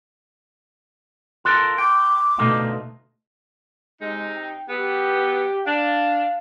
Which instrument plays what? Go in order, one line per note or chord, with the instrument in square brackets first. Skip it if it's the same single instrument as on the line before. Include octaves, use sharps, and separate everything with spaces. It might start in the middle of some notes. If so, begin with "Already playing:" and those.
[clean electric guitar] F4 A4 A#4 [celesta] C6 F#6
[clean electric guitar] G5 [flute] D6
[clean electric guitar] D2 D#4 F4 [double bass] B2 A3
[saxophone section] C3 D#4 [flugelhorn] G#3
[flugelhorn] G5
[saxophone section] F#3 B3 [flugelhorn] G4
[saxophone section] D4 [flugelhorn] F5